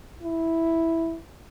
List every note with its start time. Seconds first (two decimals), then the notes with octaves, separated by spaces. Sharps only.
0.23 E4